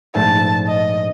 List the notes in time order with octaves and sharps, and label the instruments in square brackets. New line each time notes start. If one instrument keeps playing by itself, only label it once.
[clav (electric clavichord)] A#1 G#2 A3 [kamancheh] A5
[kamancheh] D#5